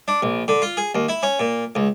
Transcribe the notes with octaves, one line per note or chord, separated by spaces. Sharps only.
D4
A#1
D3
F4
G#4
D#2
E4
C#4
A#2
C#2